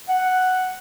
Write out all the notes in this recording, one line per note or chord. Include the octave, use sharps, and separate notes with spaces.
F#5